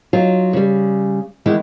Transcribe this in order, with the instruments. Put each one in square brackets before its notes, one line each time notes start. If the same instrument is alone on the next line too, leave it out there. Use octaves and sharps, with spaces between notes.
[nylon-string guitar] F#3 D#4 F4
C#3 G3
D#3 E3 G#3 B3 E4